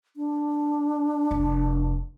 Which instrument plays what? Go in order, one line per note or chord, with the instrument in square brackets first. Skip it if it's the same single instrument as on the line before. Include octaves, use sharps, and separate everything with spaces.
[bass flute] D4
[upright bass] F1